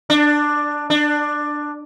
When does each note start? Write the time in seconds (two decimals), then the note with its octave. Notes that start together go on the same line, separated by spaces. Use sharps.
0.10 D4
0.90 D4